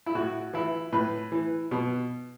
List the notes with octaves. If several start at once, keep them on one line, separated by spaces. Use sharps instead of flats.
E4
A2 F#4
E3 E4
A2 B4
E3
B2